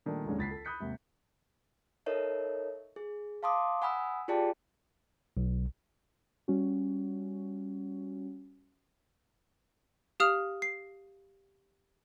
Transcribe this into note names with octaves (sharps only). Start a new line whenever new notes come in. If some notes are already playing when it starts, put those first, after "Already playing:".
A#2 D#3 G3 A3 D4
F#1 D#2 G#2 D3 G#3 C#4
C#2 A6 B6 C7
A4
B5 D#6 F#6 G6 B6 C#7
D#2 G#2 C3
D#4 A4 A#4 C#5 D#5 E5
G#4
F5 A5 C6 D6 D#6
F#5 G#5 B5 D#6 E6
F4 G4 G#4 D5 G5 A5
B1
G3 C#4 F#4
G4 F5 D#6 F6 F7
C7